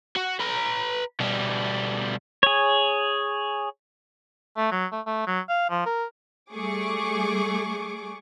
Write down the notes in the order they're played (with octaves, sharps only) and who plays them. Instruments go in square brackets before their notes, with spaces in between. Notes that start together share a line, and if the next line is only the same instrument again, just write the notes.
[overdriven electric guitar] F#4
B4 A#5
B2 G3
[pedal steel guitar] G#4 C#5
[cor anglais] A3
F#3
A3
A3
F#3
F5
F3
A#4
[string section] G3 A3 G#4 C#6 D6